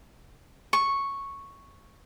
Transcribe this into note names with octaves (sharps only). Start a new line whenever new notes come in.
C#6